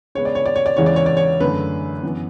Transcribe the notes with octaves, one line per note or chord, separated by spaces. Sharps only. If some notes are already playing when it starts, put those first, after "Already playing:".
C#3 G#3 B3 C#5
D5
C#5
D5
C#5
D5
E2 C#3 E3 G#3 C#5
D5
C#5
D5
C#5
F#2 D3 A3 B4
F#2 E3 B3